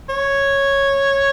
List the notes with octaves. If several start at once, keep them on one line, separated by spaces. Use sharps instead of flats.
C#5